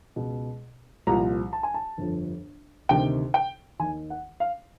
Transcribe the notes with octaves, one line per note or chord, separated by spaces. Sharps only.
C#2 B2
C2 A#2 F3 A#5
A5
G#5
A5
G1 F2 D3 F3
D2 C3 D#3 G5
G5
D#2 D#3 G#5
F#5
F5